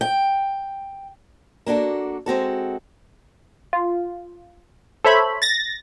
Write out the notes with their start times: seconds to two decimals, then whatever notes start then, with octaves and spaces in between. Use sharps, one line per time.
0.01 G5
1.66 A#3 D4 F#4 A4
2.26 G#3 C4 F#4 A4
3.73 F4
5.05 A4 C5 C#5 E5 B5
5.42 A6 A#6